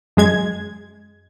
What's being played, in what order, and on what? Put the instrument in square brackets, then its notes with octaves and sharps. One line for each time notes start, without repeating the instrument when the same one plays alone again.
[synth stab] F#2 G#3 G#6